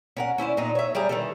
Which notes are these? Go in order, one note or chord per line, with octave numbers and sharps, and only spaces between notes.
C#4 A#4 F#5
C#4 E4 C5 D5
A#2 D4 D#4
C#5 E5
G3 G4 G#4 A#5
D#3 E3 A4